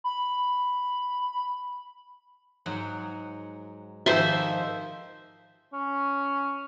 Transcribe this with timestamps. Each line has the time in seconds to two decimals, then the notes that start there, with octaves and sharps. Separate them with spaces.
0.04 B5
2.66 G#2 F#3 F#5
4.06 G#2 D#3 F3 C5 E5
5.73 C#4